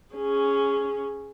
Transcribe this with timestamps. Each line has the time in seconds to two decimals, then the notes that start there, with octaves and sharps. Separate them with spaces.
0.15 C#4 G#4